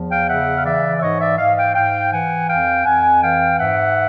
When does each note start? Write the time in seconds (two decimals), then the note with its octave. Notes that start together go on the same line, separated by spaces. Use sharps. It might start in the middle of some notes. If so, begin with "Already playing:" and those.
Already playing: E2 F3
0.10 F5 G5
0.28 C#3 E5 F#5
0.54 F5
0.65 E3 D5 E5
0.97 E5
1.01 G#2 C#5 D#5
1.20 D5 E5
1.38 G#2 D#5 F5
1.57 F5 G5
1.75 G#2 F5 G5
2.11 E3 F#5 G#5
2.49 F2 F5 G5
2.85 F2 F#5 G#5
3.22 E3 F5 G5
3.59 G#2 E5 F#5